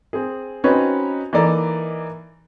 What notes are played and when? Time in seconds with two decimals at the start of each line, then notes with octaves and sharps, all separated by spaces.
0.13 C4 G#4
0.64 C4 C#4 D#4 F#4 B4 C#5
1.33 E3 A#3 D#4 A4 D5 A#5